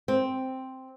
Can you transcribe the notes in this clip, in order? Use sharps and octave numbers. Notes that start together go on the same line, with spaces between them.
C4